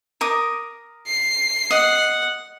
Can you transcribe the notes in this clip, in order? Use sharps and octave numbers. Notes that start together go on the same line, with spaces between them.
A#4 D6 D#6
C7
D#5 F#5